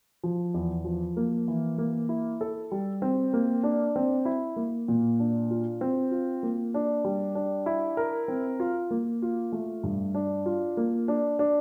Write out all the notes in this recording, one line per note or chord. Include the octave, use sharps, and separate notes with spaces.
F3
E2
F3
A#3
E3
A#3
E4
A4
G3
C4
A#3
D4
C4
E4
A#3
A#2
D4
F4
C4
F4
A#3
D4
G3
D4
E4
A#4
C4
F4
A#3
F4
A3
G2
D4
F4
A#3
D4
D4